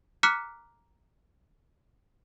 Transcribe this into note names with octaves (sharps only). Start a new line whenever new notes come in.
A#5 D6 F6 F#6 B6 C#7